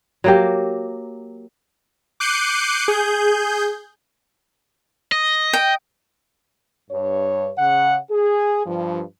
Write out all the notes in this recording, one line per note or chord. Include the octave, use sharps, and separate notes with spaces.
F#3 A#3 G4
D6 F#6 G6 C7 C#7 D#7
G#4 G6
D#5
G5
G2 C#5
C#3 F#5
G#4
G2 F3